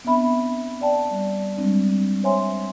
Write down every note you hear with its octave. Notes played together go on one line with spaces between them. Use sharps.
B3 C4 D4 E5 B5
D5 G5 A5
G3
G3 G#3 C4 D4
C5 C#5 E5 G#5 C6